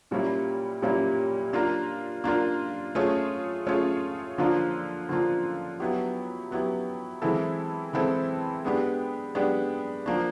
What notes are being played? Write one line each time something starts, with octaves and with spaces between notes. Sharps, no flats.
A#2 G3 A#3 C#4 E4
A#2 G3 A#3 C#4 E4
A#3 D4 F4 A#4
A#3 D4 F4 A#4
A3 C#4 F4 G#4 C#5
A3 C#4 F4 G#4 C#5
D3 F3 A#3 D4 F4
D3 F3 A#3 D4 F4
F#3 B3 E4 G4
F#3 B3 E4 G4
E3 G#3 C4 E4 A4
E3 G#3 C4 E4 A4
G#3 B3 D4 G4
G#3 B3 D4 G4
F3 A#3 D4